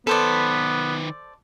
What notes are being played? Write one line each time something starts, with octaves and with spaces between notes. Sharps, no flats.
D#3 B3 A4 B4 C5 D5